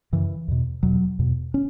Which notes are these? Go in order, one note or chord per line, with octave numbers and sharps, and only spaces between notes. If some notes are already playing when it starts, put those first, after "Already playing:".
F#2 C#3 E3
E2 B2
E2 B2 F#3
E2 B2
C#4